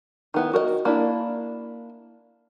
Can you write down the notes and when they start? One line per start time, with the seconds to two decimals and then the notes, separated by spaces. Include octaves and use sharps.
0.34 D#3 B3 E4
0.53 F#4 A#4 C5 D#5
0.85 A#3 D4 E4